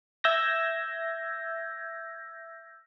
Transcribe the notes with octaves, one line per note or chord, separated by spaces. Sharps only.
E5 E6 G6 G#6 A#6